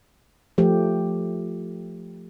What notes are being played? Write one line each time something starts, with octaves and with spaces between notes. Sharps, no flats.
F3 A3 G4